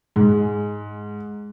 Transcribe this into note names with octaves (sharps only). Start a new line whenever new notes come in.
G#2 G#3